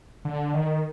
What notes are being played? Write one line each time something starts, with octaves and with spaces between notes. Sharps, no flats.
D3
D#3